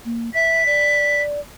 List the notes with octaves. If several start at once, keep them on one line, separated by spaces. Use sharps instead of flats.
A#3
E5 B6
D5